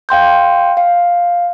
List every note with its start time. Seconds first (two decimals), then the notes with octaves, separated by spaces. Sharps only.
0.09 F5 G5 C6 G6
0.77 F5